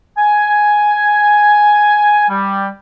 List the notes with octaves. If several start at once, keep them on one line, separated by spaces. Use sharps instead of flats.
G#5
G3